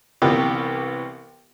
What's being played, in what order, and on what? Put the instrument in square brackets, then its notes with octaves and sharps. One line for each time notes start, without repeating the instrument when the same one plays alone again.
[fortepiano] C2 C3 E3 B3 F4 G4